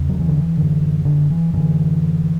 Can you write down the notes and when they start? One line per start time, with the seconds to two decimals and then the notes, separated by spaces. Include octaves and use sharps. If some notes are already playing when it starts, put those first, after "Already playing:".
Already playing: E2 C#3
0.09 F#3
0.19 E3
0.28 D3
0.40 E3
0.57 F#2 D3
1.05 D3
1.30 E3
1.53 F#2 D3 E3